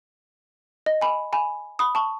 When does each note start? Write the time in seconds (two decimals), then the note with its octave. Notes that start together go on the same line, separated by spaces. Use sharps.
0.86 D#5
1.01 G#5 B5
1.33 G#5 B5
1.79 B5 D#6
1.95 A5 C#6